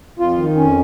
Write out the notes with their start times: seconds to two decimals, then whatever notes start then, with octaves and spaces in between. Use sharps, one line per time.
0.19 F2 F4
0.37 D#3
0.56 F2 C#4